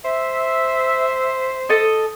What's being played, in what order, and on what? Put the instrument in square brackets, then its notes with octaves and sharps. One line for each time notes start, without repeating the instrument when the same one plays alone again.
[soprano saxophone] C5 [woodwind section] E5
[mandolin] A4 D#5